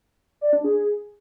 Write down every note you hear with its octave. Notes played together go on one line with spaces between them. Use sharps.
D5
D4
G#4